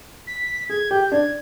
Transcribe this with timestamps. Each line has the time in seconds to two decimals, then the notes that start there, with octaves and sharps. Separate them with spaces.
0.27 B6
0.69 G#4 G#6
0.90 G4 G6
1.12 D4 G#6